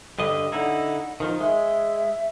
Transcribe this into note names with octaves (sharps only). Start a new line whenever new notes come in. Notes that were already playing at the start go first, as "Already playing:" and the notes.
G2 D3 D#5
D3 D#4 E4 F#5
D#3 F3
G#3 E5